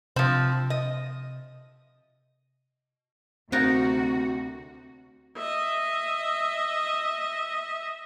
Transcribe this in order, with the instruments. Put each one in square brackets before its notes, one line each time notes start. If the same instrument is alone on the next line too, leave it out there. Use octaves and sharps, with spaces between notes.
[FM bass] C3 [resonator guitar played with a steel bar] F3 C4
[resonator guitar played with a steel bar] D#5
[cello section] D2 C3 F#4 [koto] B3 D#4 A#4 [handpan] C4 F5
[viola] D#5 E5